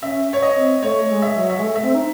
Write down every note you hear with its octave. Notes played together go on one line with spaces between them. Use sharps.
C#4 E5
C#5
D#5
C4
A3 C#5
G#3
E5
F#3
E5
G#3
A3
E5
C4
D#4